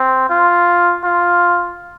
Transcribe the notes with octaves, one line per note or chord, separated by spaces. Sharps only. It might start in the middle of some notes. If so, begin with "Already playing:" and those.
Already playing: C4
F4
F4